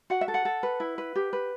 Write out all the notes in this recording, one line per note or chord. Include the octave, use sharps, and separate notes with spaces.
F#4 F#5
E5
A4
F#5
A4
B4
E4
B4
G4
B4